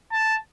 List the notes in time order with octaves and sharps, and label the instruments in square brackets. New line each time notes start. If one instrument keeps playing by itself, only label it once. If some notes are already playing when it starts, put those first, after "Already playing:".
[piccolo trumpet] A5